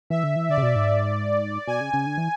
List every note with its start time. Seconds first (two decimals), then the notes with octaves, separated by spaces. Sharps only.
0.10 E3 E5
0.24 D3
0.36 E3
0.49 D3 D5
0.58 C#3
0.63 B2
0.76 G#2
1.67 B2 G#5
1.81 C#3
1.93 C#3
2.06 D3
2.18 E3